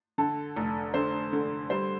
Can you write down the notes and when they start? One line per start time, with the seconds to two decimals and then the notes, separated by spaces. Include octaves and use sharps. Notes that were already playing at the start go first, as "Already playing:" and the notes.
0.18 D3 A4
0.56 F1
0.94 D3 C5
1.33 D3
1.70 G3 C5